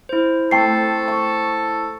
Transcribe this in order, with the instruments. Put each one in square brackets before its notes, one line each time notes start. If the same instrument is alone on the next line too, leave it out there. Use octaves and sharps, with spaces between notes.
[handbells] E4 C5
[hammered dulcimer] A3 C4 [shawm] A4 [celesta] G5 C7
[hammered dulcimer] C#6